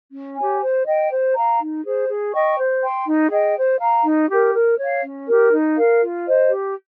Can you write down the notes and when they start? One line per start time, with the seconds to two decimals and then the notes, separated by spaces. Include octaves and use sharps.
0.13 C#4
0.37 G4 C#5 G#5
0.61 C5
0.86 D#5 G5
1.11 C5
1.35 F5 A#5
1.59 D#4
1.84 G#4 C5
2.09 G#4
2.33 D#5 G5 C#6
2.57 C5
2.82 G5 C6
3.06 D#4
3.31 G#4 D#5 G5
3.56 C5
3.80 F5 A#5
4.04 D#4
4.30 G4 A#4
4.54 A#4
4.78 C#5 F5
5.03 C#4
5.27 G4 A#4
5.52 D#4
5.76 A#4 F5
6.01 F4
6.26 C5 D#5
6.49 G4